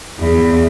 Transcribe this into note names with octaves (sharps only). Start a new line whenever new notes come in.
E2